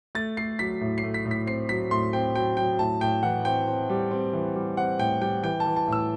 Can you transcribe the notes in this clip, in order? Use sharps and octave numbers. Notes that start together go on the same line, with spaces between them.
A3 A6
A3 C7
F#3 B6
A2
C7
A3
B6
A2
B6
C4 C7
F#3 B6
A2 C6
C4 G5
F#3 G5
F#3 G5
A2 A5
A2 G5
E3 F#5
C4 G5
C4
G3
C4
E3
G3
C4 F#5
A2 G5
G3 G5
E3 G5
A5
E3
A5
A2 E6